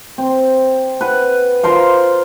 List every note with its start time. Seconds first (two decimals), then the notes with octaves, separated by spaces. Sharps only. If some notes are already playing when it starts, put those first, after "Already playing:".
0.18 C4
1.01 B4 F#5
1.63 F4 A#4 C5 F5